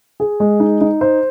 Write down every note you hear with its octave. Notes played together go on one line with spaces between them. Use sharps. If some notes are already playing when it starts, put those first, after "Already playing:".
G#4
G#3
D#4
D#4
C5